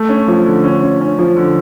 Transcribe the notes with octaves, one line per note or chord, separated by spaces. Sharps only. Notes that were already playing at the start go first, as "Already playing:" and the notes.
Already playing: A3
C#4
F3
D3
C#4
C#4
C#4
F3
D3